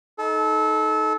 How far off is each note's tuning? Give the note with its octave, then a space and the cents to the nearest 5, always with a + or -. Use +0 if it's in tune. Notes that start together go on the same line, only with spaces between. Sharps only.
D#4 +15 A4 -25